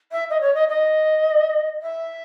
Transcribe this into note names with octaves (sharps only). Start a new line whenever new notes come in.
E5
D#5
C#5
D#5
D#5
E5